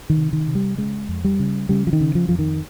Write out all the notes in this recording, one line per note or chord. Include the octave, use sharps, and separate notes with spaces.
D#3
C3
D#3
C3
G3
C#3 G#3
F2
G3
C#3
C#3 G3
F3
D#3
C#3
F3
F2 F3
D#3